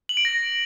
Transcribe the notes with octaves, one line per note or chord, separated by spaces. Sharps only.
F#7
D7
A#6